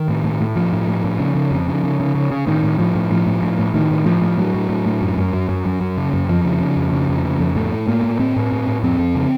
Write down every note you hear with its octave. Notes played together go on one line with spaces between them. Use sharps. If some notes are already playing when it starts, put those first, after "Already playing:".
Already playing: D#3
A2
A2
A2
A2 F3
A2
A2
A2
C#3
C#3
F2
C#3
C#3
C#3
C#3
C#3
A2 D#3
A2
A2 F3
A2
A2 F3
A2
A2
A2
A2 D#3
A2
A2 F3
A2
A2 F#3
A2
A2
A2
F#2
F#2
F#2
F#2
F#2
F#2
C#3
F#2
F2 F3
C#3
C#3
F2
C#3
F2
C#3
F2
A2 A3
A2
A2 A#3
A2
A2 C4
A2
A2
A2
F2 C4
F2
C#3